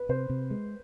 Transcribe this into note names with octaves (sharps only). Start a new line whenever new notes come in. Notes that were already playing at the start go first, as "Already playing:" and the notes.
Already playing: B4
C3 C5
C3
G#3